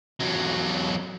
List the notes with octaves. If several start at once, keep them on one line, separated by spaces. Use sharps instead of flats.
E2 F#3